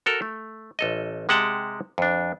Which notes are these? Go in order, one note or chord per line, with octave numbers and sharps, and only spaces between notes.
F#4 A4 A#4
A3
A1 A4 D#5
C3 G#3 G4 F#5 G5 A5
F2 D4